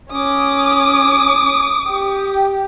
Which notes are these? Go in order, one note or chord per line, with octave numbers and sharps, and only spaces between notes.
C#4 D6 D#6
G4